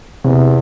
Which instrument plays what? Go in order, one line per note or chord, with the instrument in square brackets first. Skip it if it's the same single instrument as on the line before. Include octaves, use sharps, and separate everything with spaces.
[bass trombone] E2 [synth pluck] C3